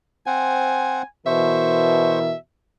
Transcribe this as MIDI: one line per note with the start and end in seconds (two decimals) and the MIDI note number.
0.26 1.02 60
0.26 1.02 72
0.26 1.02 78
0.26 1.04 80
1.26 2.33 47
1.26 2.33 52
1.26 2.33 70
1.26 2.19 72
1.26 2.34 76
1.26 2.19 85